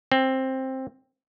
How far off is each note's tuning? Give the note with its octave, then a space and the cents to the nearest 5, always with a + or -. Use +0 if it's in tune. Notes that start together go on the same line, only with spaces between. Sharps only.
C4 +10